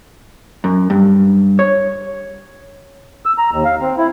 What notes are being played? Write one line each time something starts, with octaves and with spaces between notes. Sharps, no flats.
F#2
G2
C#5
E6
A#5
D#2
F5
C4
E4